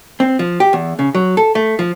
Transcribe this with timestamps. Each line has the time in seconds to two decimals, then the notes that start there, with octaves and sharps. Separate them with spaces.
0.20 C4
0.39 F3
0.60 G4
0.73 E2
0.99 C#3
1.15 F#3
1.37 A4
1.55 A3
1.79 F3